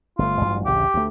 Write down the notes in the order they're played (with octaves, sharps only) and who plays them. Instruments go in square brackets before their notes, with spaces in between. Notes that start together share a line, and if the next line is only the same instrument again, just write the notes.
[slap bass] G1 C3 A3 [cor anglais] F4
[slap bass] A1 G2 F#3
[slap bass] A1 D2 C#3 [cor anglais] G4
[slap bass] D2 A3